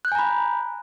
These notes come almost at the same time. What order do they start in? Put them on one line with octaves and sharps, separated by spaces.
F#6 G6 G#5 A#5 B5